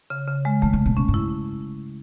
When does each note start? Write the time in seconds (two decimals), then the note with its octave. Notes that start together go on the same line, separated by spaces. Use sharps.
0.10 C#3
0.28 C#3
0.45 G#3
0.62 D#3 A3
0.73 C#3
0.86 B2
0.97 B2 C#4
1.08 G#2
1.14 E4